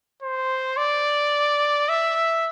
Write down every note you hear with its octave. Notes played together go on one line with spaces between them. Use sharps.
C5
D5
E5